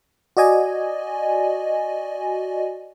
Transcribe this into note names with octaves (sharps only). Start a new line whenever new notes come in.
F#4 D5 D#5 G#5